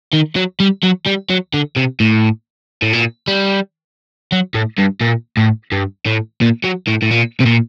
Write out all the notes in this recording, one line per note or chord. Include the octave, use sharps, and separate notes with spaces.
D#3
F#3
G3
F#3
G3
F#3
D3
C3
A2
A2
A#2
G3
F#3
A2
G2
A#2
A2
G2
A2
A#2
F#3
A2
A2
A#2
C3
A#2